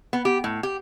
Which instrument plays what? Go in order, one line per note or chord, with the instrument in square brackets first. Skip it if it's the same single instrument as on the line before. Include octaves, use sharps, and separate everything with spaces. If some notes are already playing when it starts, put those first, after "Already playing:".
[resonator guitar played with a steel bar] B3
G4
A2
G4